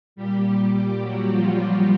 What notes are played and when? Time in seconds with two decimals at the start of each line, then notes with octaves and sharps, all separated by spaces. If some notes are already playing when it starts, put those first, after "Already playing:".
0.16 A#2 G3 G4
1.01 F#3 F#4
1.30 F3 F4
1.58 F3 F4